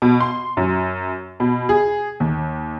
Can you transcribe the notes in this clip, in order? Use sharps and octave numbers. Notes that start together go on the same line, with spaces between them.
B2
C6
F#2
B2
G#4
D#2